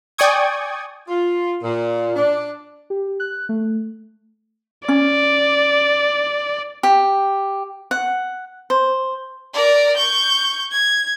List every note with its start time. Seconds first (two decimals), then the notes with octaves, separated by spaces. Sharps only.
0.18 D5 G5 G#5 C#6 D#6 G#6
1.08 F4
1.63 A#2
2.15 D4
2.90 G4
3.20 F#6
3.49 A3
4.88 C#4 D5
6.83 G4
7.91 F#5
8.70 C5
9.53 A#4 D5
9.97 C#6 G6
10.72 G#6